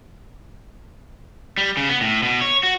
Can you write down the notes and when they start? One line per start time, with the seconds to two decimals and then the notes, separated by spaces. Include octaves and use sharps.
1.58 G3
1.77 C#3
1.89 B3
2.01 A2
2.23 B2
2.41 C#5
2.63 F#4